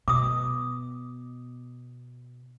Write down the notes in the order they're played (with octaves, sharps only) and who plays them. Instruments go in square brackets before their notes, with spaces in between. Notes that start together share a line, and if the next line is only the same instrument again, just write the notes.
[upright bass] B2 [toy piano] D6 D#6